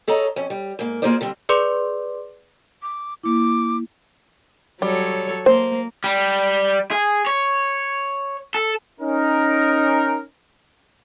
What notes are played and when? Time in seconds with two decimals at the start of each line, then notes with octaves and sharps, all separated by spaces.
0.08 G#4 A4 C#5 D#5 A#5
0.36 F2 C#4
0.50 G3
0.79 G#2 A#3
1.02 A#3 F4 G#4 A#4 C5 D5
1.21 D3 G3 C4
1.49 G#4 B4 D5 C6 D6
2.82 D6
3.24 A#3 E4 D6
4.82 F#3 G3 A4 C#5
5.46 A#3 C5
6.04 G3
6.91 G#4
7.27 C#5
8.55 A4
9.01 C#4 D#4 A#4